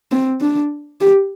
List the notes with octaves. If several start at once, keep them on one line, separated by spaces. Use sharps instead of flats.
C4
D4
G4